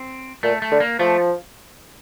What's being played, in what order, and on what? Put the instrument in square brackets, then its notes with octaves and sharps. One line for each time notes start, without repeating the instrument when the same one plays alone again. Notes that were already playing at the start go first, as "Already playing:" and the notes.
Already playing: [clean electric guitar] C4
[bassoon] A#2 [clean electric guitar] A3
[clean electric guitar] A3
[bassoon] D3
[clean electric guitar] A#3
[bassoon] F3 [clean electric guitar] A3